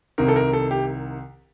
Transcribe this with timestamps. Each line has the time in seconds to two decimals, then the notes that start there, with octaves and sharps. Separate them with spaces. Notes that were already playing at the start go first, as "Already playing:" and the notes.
0.18 C2 C3 D#3 A#4
0.28 A4
0.36 A#4
0.53 A4
0.71 G4